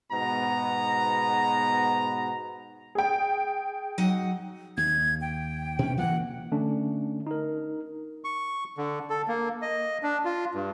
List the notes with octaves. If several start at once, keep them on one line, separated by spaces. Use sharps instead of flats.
G#2 B2 B3 A#5
G#4 G5
F#3 D#4 F#5
D#2 G#6
G5
B2 C#4
E3 A#3 F#5
D3 A3 C#4 D4
D#4 A#4
C#6
D3
A4
A#3
D#5
D4
F4
G2